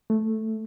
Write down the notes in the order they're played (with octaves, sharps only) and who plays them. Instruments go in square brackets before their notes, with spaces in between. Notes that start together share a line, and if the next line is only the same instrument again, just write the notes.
[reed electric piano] A3